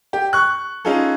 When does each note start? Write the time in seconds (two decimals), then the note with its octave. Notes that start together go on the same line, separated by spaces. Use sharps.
0.13 G4
0.33 C#6 F#6
0.85 C#4 D#4 F4 G#4 A4